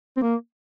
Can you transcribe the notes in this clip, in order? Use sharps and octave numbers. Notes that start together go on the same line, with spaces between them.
C4
A#3